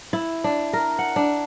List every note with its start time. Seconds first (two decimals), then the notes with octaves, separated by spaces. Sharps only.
0.13 E4
0.44 D4
0.73 A#4
0.99 F#5
1.16 D4